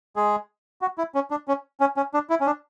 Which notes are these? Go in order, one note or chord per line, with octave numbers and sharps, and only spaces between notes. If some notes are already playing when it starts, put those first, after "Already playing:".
G#3 G#4
F#4
E4
C#4
D4
C#4
C#4
C#4
D4
E4
C#4
D4